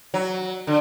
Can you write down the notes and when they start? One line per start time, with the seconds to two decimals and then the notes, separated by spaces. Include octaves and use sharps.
0.14 F#3
0.67 D3